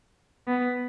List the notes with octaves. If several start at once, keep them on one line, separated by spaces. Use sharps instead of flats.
B3